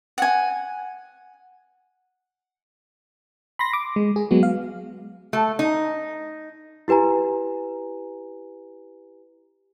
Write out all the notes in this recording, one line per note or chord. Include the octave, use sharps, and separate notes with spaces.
F#5 G#5
B5 C6 A#6
D6
G#3
G#4
F#3 G#3 B3 F#4
F5
A3
D#4
E4 G4 B4 G#5 A#5